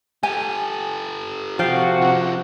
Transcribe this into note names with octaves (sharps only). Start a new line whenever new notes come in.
G4 A4 G#5
C3 F3 F#4 F5 G5
F4 G#4